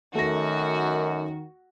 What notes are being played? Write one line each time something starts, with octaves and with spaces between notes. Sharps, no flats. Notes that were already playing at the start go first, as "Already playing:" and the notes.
F#2 D#3 A3 F#4 A#6